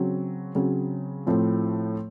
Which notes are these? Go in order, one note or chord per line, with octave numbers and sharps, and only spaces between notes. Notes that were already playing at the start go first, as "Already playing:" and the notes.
Already playing: C#3 F#3 C4
C#3 F#3 C4
A2 F3 C4